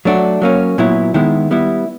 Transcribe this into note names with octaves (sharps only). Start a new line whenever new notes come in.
F#3 A3 D4 F#4
F#3 A#3 C#4
A#2 F#3 B3 E4
D#3 G#3 B3 E4
G3 B3 E4